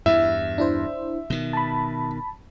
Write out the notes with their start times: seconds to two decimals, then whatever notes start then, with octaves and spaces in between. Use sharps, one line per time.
0.06 E2 G2 E4 E5
0.58 D4 E4 C5
1.30 B2 D#3
1.53 A5 B5